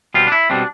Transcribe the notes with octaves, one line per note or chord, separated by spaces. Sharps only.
B2 G3 C4 F4
D4
E4
B2 G3 C4 D4